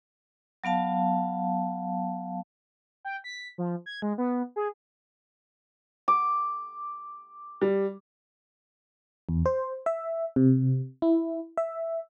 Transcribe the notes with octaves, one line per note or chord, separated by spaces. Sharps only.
F#3 B3 F5 A5
G5
B6
F3
G#6
G#3
B3
G#4
D6
G3
E2
C5
E5
C3
E4
E5